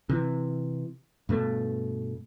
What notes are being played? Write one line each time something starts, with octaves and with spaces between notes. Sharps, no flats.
C3 E3
G2 B2 A3